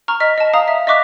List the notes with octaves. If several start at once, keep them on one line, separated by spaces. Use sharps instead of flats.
A#5 C#6 F6
D#5 F6 B6
D#5 A5
F5 A#5 D#6
E5
D#5 E5 C#6 D6 F#6 B6